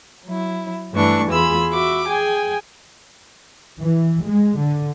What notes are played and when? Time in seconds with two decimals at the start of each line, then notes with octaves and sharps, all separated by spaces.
0.27 F#3 E4
0.94 G2 E3 A3 D4 C#6
1.31 E2 F4 G#4 B5 E6
1.72 F#4 E5 B5 D6
2.06 G#4 G5 G#5
3.81 E3
4.26 G#3
4.58 D3